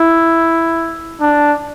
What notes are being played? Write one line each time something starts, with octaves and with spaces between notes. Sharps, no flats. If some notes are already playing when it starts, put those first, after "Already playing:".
Already playing: E4
D4